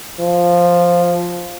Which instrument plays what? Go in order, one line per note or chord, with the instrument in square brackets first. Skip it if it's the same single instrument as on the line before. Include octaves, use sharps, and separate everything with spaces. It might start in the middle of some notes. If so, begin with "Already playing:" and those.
[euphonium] F3